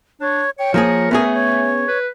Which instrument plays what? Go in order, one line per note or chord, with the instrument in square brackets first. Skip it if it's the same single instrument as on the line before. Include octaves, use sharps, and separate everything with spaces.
[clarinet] D4 [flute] C#5
[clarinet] C#5 [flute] G5
[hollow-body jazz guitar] F3 A#3 G#4 [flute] A#4
[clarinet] A3 [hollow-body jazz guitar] B3 C#4 G#4
[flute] C#5
[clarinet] B4